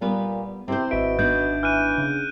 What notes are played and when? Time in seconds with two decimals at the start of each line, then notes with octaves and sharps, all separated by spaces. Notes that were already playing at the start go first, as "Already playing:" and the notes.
0.01 A#2 G3 B3 B4
0.68 C3 C4 E4 C5
0.91 G#1 B2 E5 D7
1.19 B3 D4 D#4 G6
1.63 E3 F6 F#6 D#7
1.98 C#3